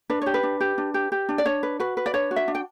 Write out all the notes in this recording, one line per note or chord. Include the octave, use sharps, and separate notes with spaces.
D4 B4
G4 C#5
B4
D4
G4
D4
G4
G4
D4
D5
D4 C#5
B4
F#4 B4
B4
D5
D4 C#5
F#4
E5
D4
G5